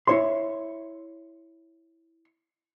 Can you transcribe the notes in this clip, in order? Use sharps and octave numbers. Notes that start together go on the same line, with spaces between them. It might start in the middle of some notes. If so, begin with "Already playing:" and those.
E4 C#5 C6